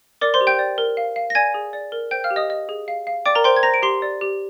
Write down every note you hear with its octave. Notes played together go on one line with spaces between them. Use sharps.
A#4 D5 D6
C5 C6
G4
G5 G6
D5
A#4
F5
F5
A#6
D5 G#5 G#6
G#4
D5
A#4
C5 G5 G6
F5 F6
G4
D#5 D#6
D#5
G#4
F5
F5
D5 G5 D6
A#4 A#5
C5 G5 C6
G#6
C5 A#5 A#6
D7
G4 C6 C7
D5
G4